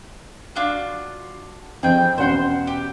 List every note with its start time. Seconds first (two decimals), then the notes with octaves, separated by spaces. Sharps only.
0.56 D4 F4 F#4
1.83 F2 C4 G#4 G5
2.18 E1 C#4 C5 F#5 C6
2.67 G4